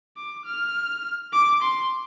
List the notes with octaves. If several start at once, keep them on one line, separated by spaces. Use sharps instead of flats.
D6
F6
D6
C6